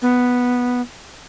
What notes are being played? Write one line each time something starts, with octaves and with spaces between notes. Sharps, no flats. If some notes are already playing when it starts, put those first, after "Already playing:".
B3